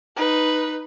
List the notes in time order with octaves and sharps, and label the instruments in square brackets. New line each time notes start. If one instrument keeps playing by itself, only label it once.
[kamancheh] D#4 B4